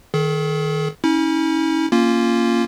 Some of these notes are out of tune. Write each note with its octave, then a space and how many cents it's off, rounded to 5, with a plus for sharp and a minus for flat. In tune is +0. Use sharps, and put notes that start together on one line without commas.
D#3 +0 G#4 +45
C#4 +0 E4 -40
A#3 +0 C#4 +0 F4 -10